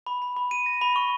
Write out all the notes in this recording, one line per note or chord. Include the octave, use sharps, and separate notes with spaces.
B5
B5
B5
D#7
A#6
B5
C#6